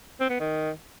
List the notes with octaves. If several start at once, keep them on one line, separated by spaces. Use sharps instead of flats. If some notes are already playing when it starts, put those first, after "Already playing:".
C4
B3
D#3